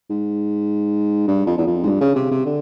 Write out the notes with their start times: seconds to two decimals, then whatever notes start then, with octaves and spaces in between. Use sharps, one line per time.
0.10 G#2
1.28 G2
1.47 F2
1.58 E2
1.67 F2
1.83 G#2
1.86 G2
2.01 C#3
2.16 C3
2.31 C3
2.46 D3